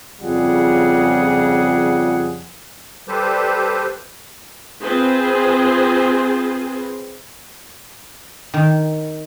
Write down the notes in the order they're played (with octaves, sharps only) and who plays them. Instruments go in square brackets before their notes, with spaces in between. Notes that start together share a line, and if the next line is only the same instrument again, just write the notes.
[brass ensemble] F2 C#3 G3 F4 G#4 F#5
[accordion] G3 G4 A4 B4 C5
[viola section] C4 F4 G#4 B4 C5
[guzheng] D#3